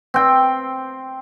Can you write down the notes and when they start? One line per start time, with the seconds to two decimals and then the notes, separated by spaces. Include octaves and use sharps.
0.14 C4 G5